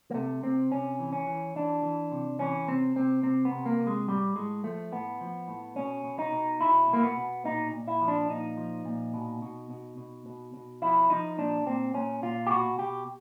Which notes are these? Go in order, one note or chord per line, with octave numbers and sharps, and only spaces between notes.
A#3
C3 A3
C3 C4
C3 C#4
E3
C#4
E3
E3 D4
E3
C3
E3 C#4
C3 C4
C3 C4
C3 C4
B3
C3
A#3
C3
G#3
A2 G3
A2 G#3
F3 A3
A2 B3
F3
A2
B2 C#4
B2
D#4
B2
B2 E4
B2 A#3
B3
B2
A#2 D#4
A#2
E4
F3
D4
A#2 D#4
F3
A#2
B2
B2
B2
B2
B2
B2
F3 E4
F3 D#4
A#2 D4
A#2 C4
A#2 C#4
A#2 F4
G4
B2 F#4
B2 G4